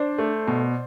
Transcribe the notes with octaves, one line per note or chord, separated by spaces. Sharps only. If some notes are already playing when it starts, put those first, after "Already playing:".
Already playing: D4 C5 D5
A3
B2